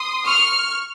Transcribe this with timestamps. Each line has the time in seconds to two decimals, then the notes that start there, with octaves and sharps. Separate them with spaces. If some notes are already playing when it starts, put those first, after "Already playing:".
Already playing: C6 D#6
0.26 C#6 F6